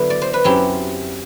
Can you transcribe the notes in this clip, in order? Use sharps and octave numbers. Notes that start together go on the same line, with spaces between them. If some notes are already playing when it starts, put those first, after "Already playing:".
Already playing: D3 F#3 B3 E4
D5
C5
B4
F#2 F#3 C4 E4 G4